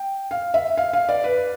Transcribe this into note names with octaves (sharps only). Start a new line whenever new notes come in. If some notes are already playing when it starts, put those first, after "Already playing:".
Already playing: G5
F5
E5
F5
F5
D5
B4